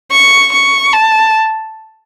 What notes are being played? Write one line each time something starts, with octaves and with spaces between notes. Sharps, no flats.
C#6
C#6
A5